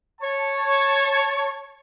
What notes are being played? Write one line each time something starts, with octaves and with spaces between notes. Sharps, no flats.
C#5 A5